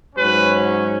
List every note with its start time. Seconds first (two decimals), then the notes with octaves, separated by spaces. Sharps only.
0.15 G#2 F#3 C#4 B4